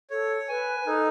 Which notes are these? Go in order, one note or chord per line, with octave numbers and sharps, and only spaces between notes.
A4 C#5
B4 G#5
B4
D#4 A4